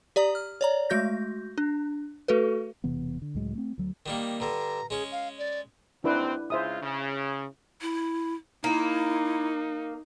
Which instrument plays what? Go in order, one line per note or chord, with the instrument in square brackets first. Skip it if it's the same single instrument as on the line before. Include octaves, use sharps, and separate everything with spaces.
[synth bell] G4 D5 A#5 D#6
F6
C#5 D5 A#5
G#3 A3 F#4 G6 A#6
D4
A3 F#4 A4 B4
[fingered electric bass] E1 C3 E3 B3
D3
C#2 A2 F#3 G#3
A3 C4
D2 F#3
[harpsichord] D#3 G3 A#3
[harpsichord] G2 D3 [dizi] A#5
[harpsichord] G#3 C#4 [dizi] G#4
[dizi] F5
D5
[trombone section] D#2 C4 [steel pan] D4 E4 B4
[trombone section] C#3 G#3 F4 [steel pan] C5 E5 D#6
[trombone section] C#3
[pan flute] E4
[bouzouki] A#3 [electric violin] D#4 [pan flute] E4